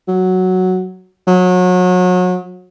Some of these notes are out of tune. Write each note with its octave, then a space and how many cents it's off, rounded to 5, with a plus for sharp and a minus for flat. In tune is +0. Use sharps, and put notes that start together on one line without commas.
F#3 +0
F#3 -30